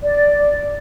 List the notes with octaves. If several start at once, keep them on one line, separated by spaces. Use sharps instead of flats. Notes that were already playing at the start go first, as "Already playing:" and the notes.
D5